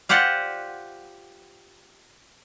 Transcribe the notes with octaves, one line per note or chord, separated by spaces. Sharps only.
F4 G4 C5 D5 F#5